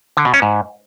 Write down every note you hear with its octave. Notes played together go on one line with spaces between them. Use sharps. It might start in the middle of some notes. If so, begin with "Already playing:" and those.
D3
B2
C#4
G#2